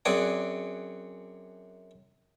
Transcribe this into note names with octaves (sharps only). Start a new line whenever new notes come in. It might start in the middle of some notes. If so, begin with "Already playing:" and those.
F#2 C4 G#4 D5 F#5 G#5